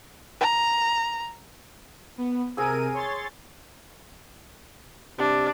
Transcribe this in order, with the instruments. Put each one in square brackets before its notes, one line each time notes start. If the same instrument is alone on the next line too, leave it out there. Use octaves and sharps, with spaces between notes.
[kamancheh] A#5
[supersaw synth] B3
[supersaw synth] C3 A#4 D#7 [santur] G#4 G#5 E6
[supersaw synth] C#5 C6 A6
[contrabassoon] C3 [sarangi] D4